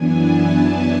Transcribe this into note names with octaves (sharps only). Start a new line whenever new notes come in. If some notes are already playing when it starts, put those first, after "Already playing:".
Already playing: F#2 E3 B3 D4 G#5
A5